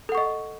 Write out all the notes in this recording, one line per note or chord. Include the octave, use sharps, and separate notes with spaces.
A4 D#5 F#5 C#6